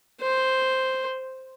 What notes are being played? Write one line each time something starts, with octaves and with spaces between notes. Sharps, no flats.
C5